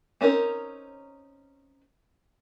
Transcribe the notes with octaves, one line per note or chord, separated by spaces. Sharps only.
C4 C#4 D#4 A#4 C#5